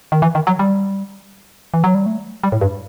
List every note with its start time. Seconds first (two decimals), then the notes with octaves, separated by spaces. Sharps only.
0.12 D#3
0.22 E3
0.35 D#3
0.47 F#3
0.59 G3
1.74 E3
1.84 F#3
1.95 G3
2.06 A3
2.44 G3
2.52 A2
2.61 G2